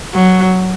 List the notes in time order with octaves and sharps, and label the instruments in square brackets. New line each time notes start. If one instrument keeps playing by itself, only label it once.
[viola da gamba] F#3